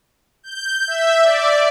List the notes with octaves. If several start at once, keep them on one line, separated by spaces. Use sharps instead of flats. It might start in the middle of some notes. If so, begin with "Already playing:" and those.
G6
E5
D5